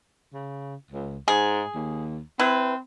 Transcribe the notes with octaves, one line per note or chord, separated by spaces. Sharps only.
C#3
C#2
G#2 G#4
D#2
C4 E4 B4